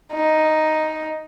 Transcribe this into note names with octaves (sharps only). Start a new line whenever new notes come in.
D#4